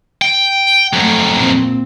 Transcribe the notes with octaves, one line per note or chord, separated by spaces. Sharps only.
G5
F2 F#3 A3
A#2 C4